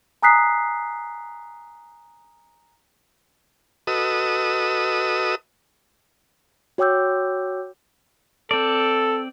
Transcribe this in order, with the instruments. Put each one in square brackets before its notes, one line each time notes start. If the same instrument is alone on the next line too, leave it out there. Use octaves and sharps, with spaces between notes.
[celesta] G#5 A#5 D#6 F#6 B6 C7
[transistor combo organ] F#4 A4 B4 D#5 D#6 E6
[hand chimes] F#4 C#5 G5 D6 E6 G6
[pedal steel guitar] C4 D5 [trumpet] A4